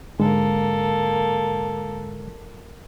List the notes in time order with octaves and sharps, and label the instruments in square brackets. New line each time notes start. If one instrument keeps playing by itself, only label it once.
[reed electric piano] G#2 D3 G#3 [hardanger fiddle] A#3 A4